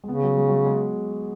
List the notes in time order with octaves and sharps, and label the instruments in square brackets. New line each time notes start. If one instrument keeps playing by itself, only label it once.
[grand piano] G#3
[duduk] C#3 [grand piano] B3
[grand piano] F#3
G#3
F#3
G#3
G#3